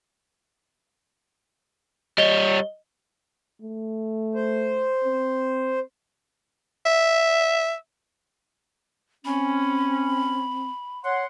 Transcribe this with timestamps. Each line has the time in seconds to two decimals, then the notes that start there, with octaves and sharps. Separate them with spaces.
2.18 G3 C#5 D#5 G7
3.62 A3
4.35 C5
5.04 C4
6.86 E5
9.25 C4 C#4 B5
11.05 C#5 F#5 C6